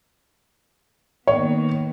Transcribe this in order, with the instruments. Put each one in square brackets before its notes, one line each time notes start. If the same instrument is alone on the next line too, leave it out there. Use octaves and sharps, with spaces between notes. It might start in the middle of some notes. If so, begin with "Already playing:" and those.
[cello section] D#3 A#3 B3 [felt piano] C#5